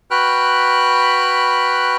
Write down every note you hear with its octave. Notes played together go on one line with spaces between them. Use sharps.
F#4 B4 G5 B5 F6 F#6